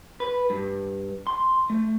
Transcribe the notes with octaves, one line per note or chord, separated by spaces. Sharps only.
B4
G2
C6
A3